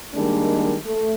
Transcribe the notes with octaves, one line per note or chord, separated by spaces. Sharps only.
D#3 G3 G#3 A#3 D4
A3